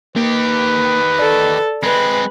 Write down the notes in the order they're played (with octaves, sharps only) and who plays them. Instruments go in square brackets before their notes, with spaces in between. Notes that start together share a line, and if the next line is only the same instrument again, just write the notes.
[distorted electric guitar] D#3 G4 [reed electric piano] A#3 [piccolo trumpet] B4
[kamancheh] A4 [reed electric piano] D5
[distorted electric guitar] G#3 C4 [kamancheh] B4